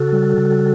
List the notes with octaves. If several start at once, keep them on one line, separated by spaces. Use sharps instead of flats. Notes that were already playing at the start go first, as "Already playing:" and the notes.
Already playing: C#3 F#4 A4
G3
C#3